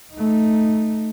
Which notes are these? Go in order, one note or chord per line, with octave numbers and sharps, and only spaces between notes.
A3 D#4